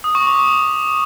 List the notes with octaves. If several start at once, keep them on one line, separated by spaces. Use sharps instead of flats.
D#6
C#6
D6